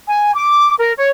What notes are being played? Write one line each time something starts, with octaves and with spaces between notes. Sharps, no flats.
G#5
D6
A#4
C#5